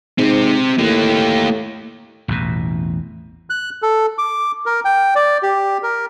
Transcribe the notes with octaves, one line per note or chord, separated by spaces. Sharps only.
G#2 C3 C4
A2 A#3 G4
A1 E2 B2
F#6
A4
D6
A#4
G5
D5
G4
A#4